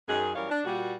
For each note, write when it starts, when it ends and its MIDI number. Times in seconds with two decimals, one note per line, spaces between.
0.08 0.35 42
0.08 0.35 51
0.08 0.35 68
0.35 0.47 42
0.35 0.47 52
0.35 0.47 55
0.35 0.47 70
0.35 0.47 73
0.35 0.47 77
0.50 0.61 62
0.65 0.94 46
0.65 0.94 55
0.65 0.94 66